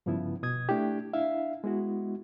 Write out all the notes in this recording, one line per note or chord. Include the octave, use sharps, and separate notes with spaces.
G2 C#3 F3 B3 E4
B2 D#6 G#6
A3 D4 E4 G4
D4 E4 E5 F5
G#3 B3 E4 F#4